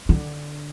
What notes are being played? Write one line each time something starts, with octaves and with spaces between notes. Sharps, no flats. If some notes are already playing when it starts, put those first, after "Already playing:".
D3